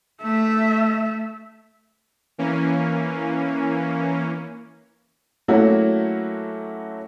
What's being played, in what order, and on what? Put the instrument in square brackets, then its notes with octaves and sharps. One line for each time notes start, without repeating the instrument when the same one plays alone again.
[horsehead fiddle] A3 E5
[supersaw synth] E3 A#3 C#4
[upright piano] F#3 A3 A#3 C#4 E4 F#4